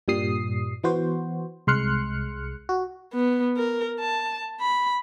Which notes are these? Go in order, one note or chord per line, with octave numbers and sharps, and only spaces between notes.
G2 A#2 G3 D#6 C7
E3 B3 F#4 C5
C2 G#3 C6 F6 F#6 C#7
F#4
B3
A#4
A5
B5